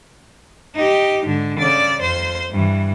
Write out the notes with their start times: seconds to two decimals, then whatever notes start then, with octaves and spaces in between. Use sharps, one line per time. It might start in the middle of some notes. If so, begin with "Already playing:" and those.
0.76 D#4 G4
1.25 G#2 D3
1.59 C#3 D5
2.02 F2 C5
2.50 G2 E3